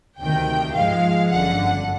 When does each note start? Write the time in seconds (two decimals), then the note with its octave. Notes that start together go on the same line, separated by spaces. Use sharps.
0.20 D2 C3 D#3 G5
0.74 G#2 F3 G#3 F5
1.30 G1 F#2 D3 F#5